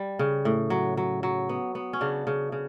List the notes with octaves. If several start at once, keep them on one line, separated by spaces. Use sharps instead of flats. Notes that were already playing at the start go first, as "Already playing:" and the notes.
Already playing: G3
C#3
A2
F#3
F#3
F#3
B3
B3
C#4
C#3 D4
C#3
C#3